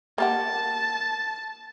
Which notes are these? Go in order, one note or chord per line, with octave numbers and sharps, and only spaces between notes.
A#3 G4 F#5 A5